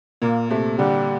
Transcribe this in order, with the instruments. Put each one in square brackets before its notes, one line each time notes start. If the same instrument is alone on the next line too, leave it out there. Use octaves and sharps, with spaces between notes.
[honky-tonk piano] A#2 [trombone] A#3
[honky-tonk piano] C3 [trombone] A3
[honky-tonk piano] D3 [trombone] G3